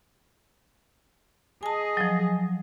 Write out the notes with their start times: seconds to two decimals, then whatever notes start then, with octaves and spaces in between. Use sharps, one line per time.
1.63 G#4 D#5 G#5 A5
1.97 F3 F#3